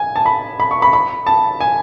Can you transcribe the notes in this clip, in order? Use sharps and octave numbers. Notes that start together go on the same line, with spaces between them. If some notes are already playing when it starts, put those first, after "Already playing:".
Already playing: G#5
A5
B5
B5
C#6
B5
B5
A5
G#5